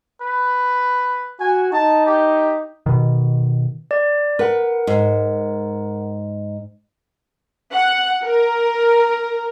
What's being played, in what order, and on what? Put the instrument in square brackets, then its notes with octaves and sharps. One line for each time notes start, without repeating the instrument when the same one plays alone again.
[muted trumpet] B4
[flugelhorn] F#4 [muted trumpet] G#5
[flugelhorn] D#4 [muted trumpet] A5
[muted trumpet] G4
[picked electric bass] B2 D#3
[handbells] D5
[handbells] A#4 F#5 [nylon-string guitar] B4
[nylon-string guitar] G#2
[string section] F#5
A#4